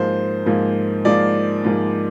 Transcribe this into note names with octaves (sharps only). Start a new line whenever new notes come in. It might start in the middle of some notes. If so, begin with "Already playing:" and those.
Already playing: G#2 F3 A#3 C5
G#2 F3 A#3
G#2 F3 A#3 D5
G#2 F3 A#3